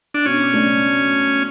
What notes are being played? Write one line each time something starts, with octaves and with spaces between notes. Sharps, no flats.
D4
B2 C#4
A3 D4